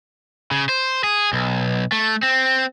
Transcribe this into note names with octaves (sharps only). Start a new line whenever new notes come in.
C#3
C5
G#4
B1
A3
C4